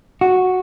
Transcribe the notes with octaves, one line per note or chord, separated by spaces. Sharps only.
F#4